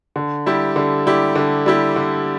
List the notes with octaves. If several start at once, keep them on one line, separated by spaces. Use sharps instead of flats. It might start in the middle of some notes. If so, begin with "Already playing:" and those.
D3
G3 E4 G4
D3
G3 E4 G4
D3
G3 E4 G4
D3